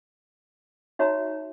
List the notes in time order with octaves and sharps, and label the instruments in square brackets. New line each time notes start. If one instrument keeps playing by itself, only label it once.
[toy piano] D#4 F#4 C#5 E5 A#5